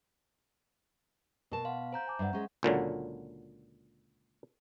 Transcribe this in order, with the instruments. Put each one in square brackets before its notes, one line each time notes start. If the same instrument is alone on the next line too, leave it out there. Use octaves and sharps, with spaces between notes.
[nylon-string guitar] B2 A5 [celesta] A#4
[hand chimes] F5 [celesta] F#5 C6
[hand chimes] C5 A#5 G6
[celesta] G#5 A5 D6
[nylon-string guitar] G2 D5 [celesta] E5 F#5
[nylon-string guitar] G#3 C#4
[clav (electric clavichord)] C#2 A#2 D3 F#3